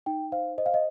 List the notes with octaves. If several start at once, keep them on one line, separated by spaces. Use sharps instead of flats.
D#4 G5
C5 F5
C5 D#5
F5
D#5